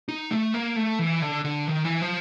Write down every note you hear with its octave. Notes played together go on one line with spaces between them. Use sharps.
D#4
A3
A#3
A3
E3
D3
D3
D#3
E3
F3